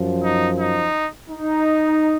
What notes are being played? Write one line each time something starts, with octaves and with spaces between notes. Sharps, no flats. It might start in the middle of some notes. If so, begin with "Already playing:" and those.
Already playing: F#2 F3
D#4
D#4
D#4